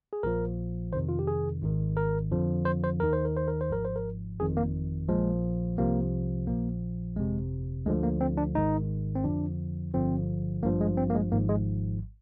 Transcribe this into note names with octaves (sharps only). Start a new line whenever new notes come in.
G#4
A#1 A#2 F3 A#4
F2 C3 D#3 C5
F4
G4
G#4
G#1 G#2 D#3
A#4
F2 D3 F3
C5
C5
D#2 D#3 A#4
C5
A#4
C5
A#4
C5
G#1 G#2 F3 A#4
C5
A#4
G1 F2 D#3 G#4
A#3
A#1 A#2 F3 G#3
C2 C3 F3 A#3
A#1 A#2 F3 A#3
G1 F2 C3 G#3
D2 D3 F3 G#3
A#3
C4
D4
G#1 G#2 D#3 D#4
C4
F2 D3 F3 D4
G1 G2 D3 F3 C4
G#1 G2 F3 A#3
G#3
C4
A#3
G#3
G#1 G#2 F3 A#3
G#3